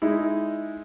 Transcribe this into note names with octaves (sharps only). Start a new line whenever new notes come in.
G#3 D#4 E4